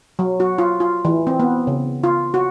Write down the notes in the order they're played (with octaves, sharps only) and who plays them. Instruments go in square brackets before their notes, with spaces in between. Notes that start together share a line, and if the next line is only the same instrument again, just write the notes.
[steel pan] F#3
F#4
F4
F4
E3
C4
B3
C#3
F4
F#4